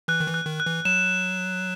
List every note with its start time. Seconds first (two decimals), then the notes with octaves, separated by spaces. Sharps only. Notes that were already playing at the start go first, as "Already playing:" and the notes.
0.08 E3 F#6
0.20 D#3
0.27 E3
0.34 F#6
0.46 D#3
0.60 F#6
0.66 E3
0.85 F#3 E7